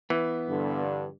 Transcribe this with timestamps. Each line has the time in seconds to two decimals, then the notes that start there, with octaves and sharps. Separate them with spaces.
0.10 E3 B3
0.48 G2 D3